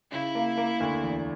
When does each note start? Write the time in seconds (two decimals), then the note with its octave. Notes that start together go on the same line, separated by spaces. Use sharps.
0.11 C#3 E4
0.35 A#3
0.58 A#3
0.80 D2
1.04 E2